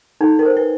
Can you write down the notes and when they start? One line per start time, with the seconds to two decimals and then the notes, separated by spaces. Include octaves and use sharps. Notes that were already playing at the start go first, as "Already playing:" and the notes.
0.21 D#4 A4
0.39 A#4
0.46 C5
0.57 B4